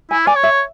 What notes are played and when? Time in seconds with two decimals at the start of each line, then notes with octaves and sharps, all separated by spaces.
0.11 E4 G#5
0.27 D5 G#5
0.36 C#5
0.43 E5